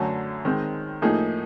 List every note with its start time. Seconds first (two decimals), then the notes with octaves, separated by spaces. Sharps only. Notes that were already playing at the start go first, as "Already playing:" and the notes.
Already playing: F#2 D3 F#3 A3
0.45 D#3 G#3 C4
1.02 A2 F3 A#3 D#4 G#4